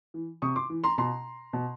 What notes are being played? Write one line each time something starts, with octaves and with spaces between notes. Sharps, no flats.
E3
C3 C#6 D#6
C6 D6
E3
A#5 C6
B2 A#5 C6
B2